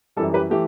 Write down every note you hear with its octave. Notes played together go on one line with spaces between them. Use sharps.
F#2 E3 G3 A4
G4 B4
E3 A3 G4